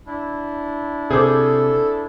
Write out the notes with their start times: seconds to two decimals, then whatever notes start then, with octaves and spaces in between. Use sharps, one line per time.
0.06 D4 E4
1.11 C3 G#4 A4 C5 D6